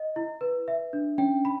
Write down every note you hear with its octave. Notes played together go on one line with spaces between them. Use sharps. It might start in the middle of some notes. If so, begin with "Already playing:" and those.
Already playing: D#5
E4
B4
E5
D4
C#4 G5
B5